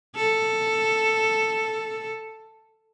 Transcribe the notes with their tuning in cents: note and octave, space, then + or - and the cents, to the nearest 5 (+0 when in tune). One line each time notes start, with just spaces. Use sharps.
A4 +5